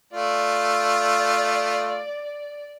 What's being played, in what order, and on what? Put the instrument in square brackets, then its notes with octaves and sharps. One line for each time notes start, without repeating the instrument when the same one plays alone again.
[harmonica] A3 F4 [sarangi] D5